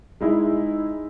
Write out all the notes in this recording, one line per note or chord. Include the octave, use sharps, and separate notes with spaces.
G#3 D#4 E4